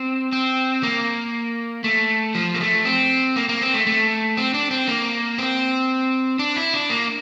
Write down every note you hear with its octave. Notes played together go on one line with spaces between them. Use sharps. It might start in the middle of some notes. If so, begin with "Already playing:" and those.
Already playing: C4
C4
A#3
A3
F3
A#3
A3
C4
A#3
A#3
C4
A3
A3
C4
D4
C4
A#3
C4
D4
E4
D4
A#3